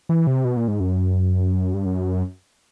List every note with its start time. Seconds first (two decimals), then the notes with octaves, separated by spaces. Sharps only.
0.09 E3
0.27 C3
0.45 B2
0.57 A#2
0.68 G#2
0.80 F#2
1.74 G2
1.86 F#2